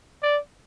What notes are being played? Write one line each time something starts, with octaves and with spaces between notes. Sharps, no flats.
D5